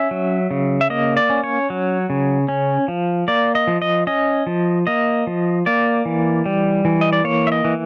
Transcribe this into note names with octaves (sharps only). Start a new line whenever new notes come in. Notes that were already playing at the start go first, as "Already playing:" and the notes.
Already playing: C#4 E5
F#3
C#3
E5
A#3 D#5
D5
C#4
C#5
F#3
C#3
C#4
F3
A#3 D5
D#5
F3
D#5
C#4 D#5
F3
A#3 D#5
F3
A#3 D5
E3
G3
E3
D#5
D5
A#3 C#5
E5
D#5
E3